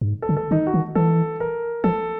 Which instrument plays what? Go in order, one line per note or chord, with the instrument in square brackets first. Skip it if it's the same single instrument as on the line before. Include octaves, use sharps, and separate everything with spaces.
[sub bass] G2
G#2
[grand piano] A4
[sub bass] D3
[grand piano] A4
[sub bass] D#3 [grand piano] D#4
[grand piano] F#4
[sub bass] D#3
[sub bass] E3 [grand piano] A4
[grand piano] A#4
[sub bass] F3 [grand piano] A4